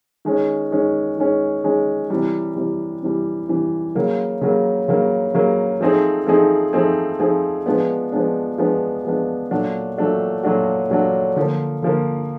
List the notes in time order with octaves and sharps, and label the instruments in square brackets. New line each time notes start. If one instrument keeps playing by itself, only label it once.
[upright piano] D#3 G#3 C#4
D#3 G#3 C#4
D#3 G#3 C#4
D#3 G#3 C#4
C3 E3 G3
C3 E3 G3
C3 E3 G3
C3 E3 G3
C#3 F#3 A#3
C#3 F#3 A#3
C#3 F#3 A#3
C#3 F#3 A#3
F3 A3 C4 D#4 G#4
F3 A3 C4 D#4 G#4
F3 A3 C4 D#4 G#4
F3 A3 C4 D#4 G#4
F3 G#3 B3 D4
F3 G#3 B3 D4
F3 G#3 B3 D4
F3 G#3 B3 D4
A#2 F#3 A3 D4 F#4
A#2 F#3 A3 D4 F#4
A#2 F#3 A3 D4 F#4
A#2 F#3 A3 D4 F#4
D3 F3 A#3
D3 F3 A#3